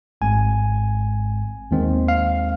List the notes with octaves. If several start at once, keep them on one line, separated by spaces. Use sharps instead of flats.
G#1 G#2 G#3 C4 G#5
D#2 D#3 G#3 C4
F5